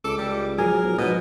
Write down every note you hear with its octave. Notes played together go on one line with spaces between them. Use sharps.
C#2 A4 D6
C#2 G3
F3 F#3 G#4 A#4
B1
G#2 B2 D#5